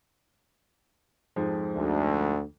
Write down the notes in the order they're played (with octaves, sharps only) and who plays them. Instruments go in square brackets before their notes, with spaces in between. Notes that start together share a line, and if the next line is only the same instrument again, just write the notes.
[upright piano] F2 G#2 F3
[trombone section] D2